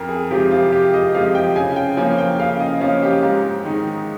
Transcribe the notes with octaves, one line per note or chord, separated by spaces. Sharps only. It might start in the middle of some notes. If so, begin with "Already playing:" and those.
Already playing: F2 A#4
G#4
C3 F3 G#3 G4
F4
F2 G4
D#5
C3 F3 G#3 F5
G5
C#3 G#5
G5
F3 A#3 C#4 G#5
G5
C#3 F5
D#5
F3 A#3 C#4 F4
G4
G#2
D#3 G#3 D#4